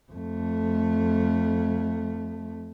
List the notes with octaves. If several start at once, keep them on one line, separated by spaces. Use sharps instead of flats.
F2 A3